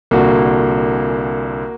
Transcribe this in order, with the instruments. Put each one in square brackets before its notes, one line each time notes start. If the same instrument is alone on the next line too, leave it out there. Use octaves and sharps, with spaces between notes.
[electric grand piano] C2 A#2 D3 [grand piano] A#3 F#4